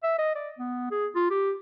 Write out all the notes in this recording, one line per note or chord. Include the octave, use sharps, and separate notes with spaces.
E5
D#5
D5
B3
G#4
F4
G4